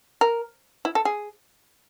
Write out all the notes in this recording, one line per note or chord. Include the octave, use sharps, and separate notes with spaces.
A#4
E4
A4
G#4